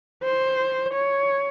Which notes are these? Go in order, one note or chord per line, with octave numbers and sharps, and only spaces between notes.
C5
C#5